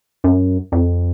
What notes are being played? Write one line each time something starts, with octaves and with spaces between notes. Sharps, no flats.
F#2
F2